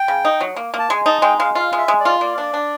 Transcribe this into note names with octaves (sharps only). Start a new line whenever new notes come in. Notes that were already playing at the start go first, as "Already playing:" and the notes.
Already playing: G5
C#3
D#4
F#3
A#3
A#3
A5
G#3 G#5
D#4 A5
G#3 G5
G#3 F5
F4 F5
G#3
E5
G#3
D5
F4
A#3 D5
D4
D4